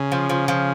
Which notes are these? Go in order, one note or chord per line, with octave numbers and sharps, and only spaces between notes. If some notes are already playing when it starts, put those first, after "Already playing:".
Already playing: C#3
F3
F3
F3